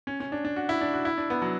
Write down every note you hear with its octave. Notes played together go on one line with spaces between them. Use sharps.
C#4
C#4
D4
D4
F#4
E4
D4
F#4
E4
D4
B3
F#3